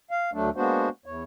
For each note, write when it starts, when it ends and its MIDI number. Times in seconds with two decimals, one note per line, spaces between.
0.11 0.30 77
0.34 0.50 38
0.34 0.50 54
0.34 0.50 57
0.34 0.50 62
0.56 0.89 56
0.56 0.89 58
0.56 0.89 59
0.56 0.89 62
0.56 0.89 66
0.56 0.89 72
1.06 1.23 40
1.06 1.23 73